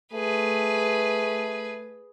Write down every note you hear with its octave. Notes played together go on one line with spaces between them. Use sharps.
A3 G#4 B4